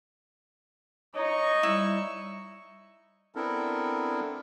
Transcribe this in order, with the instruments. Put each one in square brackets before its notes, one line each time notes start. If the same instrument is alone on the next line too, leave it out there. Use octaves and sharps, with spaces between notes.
[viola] D#4 D#5 [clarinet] C#5 [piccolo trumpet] C#6
[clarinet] G3 [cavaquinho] E4
[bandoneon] B3 C4 D4 E4 A4 A#4